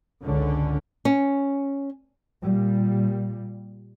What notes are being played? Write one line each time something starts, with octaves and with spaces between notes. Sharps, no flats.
G#1 C#2 D3 C#4
C#4
A#2 G3